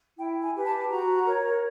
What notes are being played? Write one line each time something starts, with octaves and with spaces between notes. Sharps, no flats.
E4 G5
G#5
G4 B4
A5
F#4 A#5
A#4 C#5